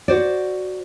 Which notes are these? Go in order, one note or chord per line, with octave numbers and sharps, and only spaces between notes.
F#4 C5 D5